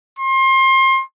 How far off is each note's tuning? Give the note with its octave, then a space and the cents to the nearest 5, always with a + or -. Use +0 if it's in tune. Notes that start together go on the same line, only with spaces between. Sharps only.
C6 +30